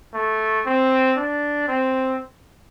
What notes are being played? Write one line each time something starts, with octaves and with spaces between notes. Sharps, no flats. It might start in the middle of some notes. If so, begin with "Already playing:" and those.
A3
C4
D4
C4